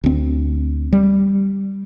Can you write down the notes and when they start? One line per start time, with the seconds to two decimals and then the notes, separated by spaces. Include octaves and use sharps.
0.04 D2 C4
0.93 G3